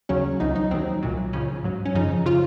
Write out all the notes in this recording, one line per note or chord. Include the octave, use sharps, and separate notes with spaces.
D#2 C#3 F#3 C#4
C#2 C3 F#3 D#4
D#4
D#2 D#3 F#3 C4
C2 A#2 F#3
C#2 C#3 F3 C#4
G#2 F#3
C#4
F#2 C#3 F3 D#4
C#3 F3 F4